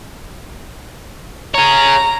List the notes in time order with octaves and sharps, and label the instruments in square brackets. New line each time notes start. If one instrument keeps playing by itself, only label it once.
[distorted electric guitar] G#4 C#5 [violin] A#5